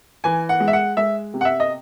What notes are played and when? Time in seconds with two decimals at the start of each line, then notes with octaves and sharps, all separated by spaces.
0.24 E3 G#5
0.49 F#5
0.60 G#3
0.68 E5
0.73 F#5
0.97 G#3 E5
1.34 C3
1.41 F#5
1.45 E5
1.60 D#5